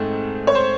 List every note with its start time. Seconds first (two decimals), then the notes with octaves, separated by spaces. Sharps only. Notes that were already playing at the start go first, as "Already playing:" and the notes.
Already playing: G#2 A3 C4 D#4
0.47 C#5
0.55 C5